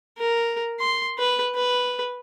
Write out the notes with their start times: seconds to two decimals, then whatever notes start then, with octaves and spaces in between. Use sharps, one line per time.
0.18 A#4
0.79 C6
1.19 B4
1.55 B4